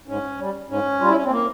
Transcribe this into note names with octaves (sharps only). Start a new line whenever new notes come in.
G#2 C#4
G3
G#2 C#4
G3 F4
E4
C#4
C4
A#3